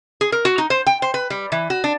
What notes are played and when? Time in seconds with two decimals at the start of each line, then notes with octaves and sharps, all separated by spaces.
0.21 G#4
0.32 A#4
0.45 F#4
0.58 D#4
0.70 C5
0.87 G5
1.02 C5
1.14 B4
1.30 G3
1.52 E3
1.70 F#4
1.84 D4